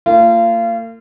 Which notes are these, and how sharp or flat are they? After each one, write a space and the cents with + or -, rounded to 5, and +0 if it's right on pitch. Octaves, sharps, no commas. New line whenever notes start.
A#3 -45 F4 -30